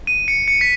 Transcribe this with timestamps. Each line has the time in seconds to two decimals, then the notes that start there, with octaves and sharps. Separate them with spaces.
0.07 D#7
0.28 C#7
0.48 C#7
0.61 B6